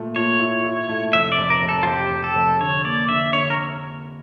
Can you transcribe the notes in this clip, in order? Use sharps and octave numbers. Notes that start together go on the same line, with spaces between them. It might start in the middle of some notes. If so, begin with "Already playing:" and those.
Already playing: A#2 A3
A#2 C#5
E4
E4
A3
F1 E5
D5
F1
A#4
F1
A4
F4
F1 G4
F1
A4
F1
D3 C#5
A#3 D5
D3 E5
D3 C#5
A#4